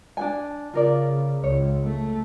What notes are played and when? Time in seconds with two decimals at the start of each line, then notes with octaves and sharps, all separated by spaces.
0.17 D4 F#4 G#5
0.74 C#3 F4 A#4 D5
1.44 C#2 C#5
1.84 A3